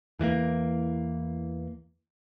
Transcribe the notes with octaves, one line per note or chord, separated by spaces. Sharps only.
E2 E3 G3 A#3